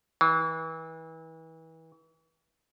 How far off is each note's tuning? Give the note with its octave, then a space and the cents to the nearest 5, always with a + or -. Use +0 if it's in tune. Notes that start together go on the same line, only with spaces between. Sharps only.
E3 -30